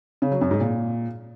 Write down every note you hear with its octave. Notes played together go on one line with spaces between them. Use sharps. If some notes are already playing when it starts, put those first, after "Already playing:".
C#3
F#3
F#2
G#2
A#2